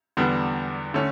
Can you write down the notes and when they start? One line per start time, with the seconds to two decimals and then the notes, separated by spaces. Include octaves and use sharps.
0.17 E2 D3 G3 B3 D4
0.94 D3 A3 C#4